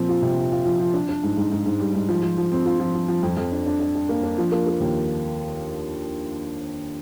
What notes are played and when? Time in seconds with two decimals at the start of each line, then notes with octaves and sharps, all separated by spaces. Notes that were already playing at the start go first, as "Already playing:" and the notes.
Already playing: A#2 F3 C4
0.09 F4
0.22 C3
0.38 F4
0.52 F4
0.65 F3
0.80 F3
0.94 D4
1.09 D4
1.23 G#2
1.37 G#2
1.52 G#2
1.66 G#2
1.80 G3
1.95 G#2
2.09 F3
2.23 F3
2.38 F3
2.52 C4
2.66 F4
2.80 F3
2.95 F3
3.08 F3
3.23 F2
3.37 F2
3.52 D4
3.66 D4
3.80 D4
3.95 D4
4.09 A#3
4.23 D4
4.38 F3
4.52 A#3
4.67 A#3
4.80 D#2